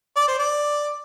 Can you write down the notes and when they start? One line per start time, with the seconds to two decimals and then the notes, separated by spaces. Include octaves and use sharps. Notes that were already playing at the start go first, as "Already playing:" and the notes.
0.16 D5
0.28 C5
0.39 D5